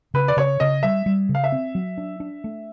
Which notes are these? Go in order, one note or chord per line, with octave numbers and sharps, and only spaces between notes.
C#3 B4
D5
C#3 C#5
C#3 D#5
G3 E5
G3
C#3
F5
E5
C4
F#3
D4
D4
A3